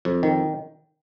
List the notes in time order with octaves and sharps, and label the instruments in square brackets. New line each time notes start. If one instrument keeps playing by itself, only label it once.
[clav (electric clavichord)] F2
D#3